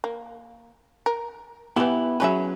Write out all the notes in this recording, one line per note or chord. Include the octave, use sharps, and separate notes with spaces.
A#3
A#4
C#3 E3 B3 E4 G4
F#3 C#4 F#4 G#4 B4 E5